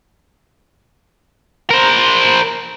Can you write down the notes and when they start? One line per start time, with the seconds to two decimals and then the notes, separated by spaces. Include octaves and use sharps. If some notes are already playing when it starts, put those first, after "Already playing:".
1.71 A#4 C5